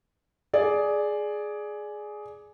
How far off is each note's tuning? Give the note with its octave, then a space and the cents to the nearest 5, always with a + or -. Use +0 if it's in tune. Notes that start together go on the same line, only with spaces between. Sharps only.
G#4 +10 D5 +0